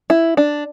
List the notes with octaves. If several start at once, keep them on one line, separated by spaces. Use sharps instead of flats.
E4
D4